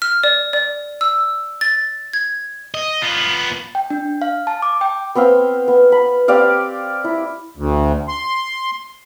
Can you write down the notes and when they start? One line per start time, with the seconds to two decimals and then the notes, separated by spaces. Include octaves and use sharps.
0.02 F6
0.24 D5
0.53 D5
1.01 E6
1.61 A6
2.13 G#6
2.74 D#5
3.02 B3 F4
3.75 G5
3.90 D4
4.22 F5
4.47 A5
4.62 D6
4.81 G5
5.15 B3 C4 C5 F5
5.68 B3
5.92 B5
6.28 C4 G4 D5 F5
7.04 E4
7.57 D2
8.08 C6